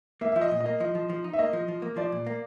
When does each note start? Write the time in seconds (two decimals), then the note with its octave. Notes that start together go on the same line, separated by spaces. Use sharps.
0.21 A#3 E5
0.32 F3 E5
0.41 D#5
0.51 A#2
0.61 D#5
0.66 A#3
0.80 F3 D#5
0.95 F3
1.10 F3
1.24 D#4
1.33 E5
1.39 A#3 D#5
1.53 F3
1.68 F3
1.82 A#3
1.97 F3 D5
2.12 A#2
2.27 A#3